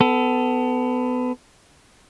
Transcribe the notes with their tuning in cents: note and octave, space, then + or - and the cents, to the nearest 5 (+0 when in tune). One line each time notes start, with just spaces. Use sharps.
B3 +25 A4 +0